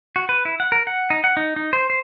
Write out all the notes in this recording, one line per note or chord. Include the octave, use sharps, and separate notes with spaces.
F#4
B4
E4
F#5
A#4
F#5
D#4
F#5
D#4
D#4
C5
C5